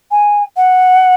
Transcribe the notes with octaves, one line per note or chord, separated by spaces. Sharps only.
G#5
F#5